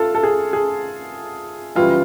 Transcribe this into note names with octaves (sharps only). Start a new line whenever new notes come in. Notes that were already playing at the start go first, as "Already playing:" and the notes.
Already playing: A3 F4 A4
A4
G#4
G#4
F#2 C#3 E3 G3 F4